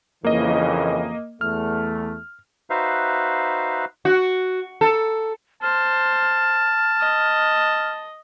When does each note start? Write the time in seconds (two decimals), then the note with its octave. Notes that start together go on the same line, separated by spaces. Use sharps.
0.24 F2 C#3 E3 A#3 D#5
1.41 E2 A3 F6
2.70 D#4 F#4 B4 C5 E5 F5
4.05 F#4
4.81 A4
5.63 C5 A5 F6
7.00 D#5